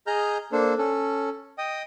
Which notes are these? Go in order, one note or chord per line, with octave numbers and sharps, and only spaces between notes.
G#4 D#5 A#5 F6 G6
A#3 D4 A4 C5
C#4 A4
D#5 G5 D#6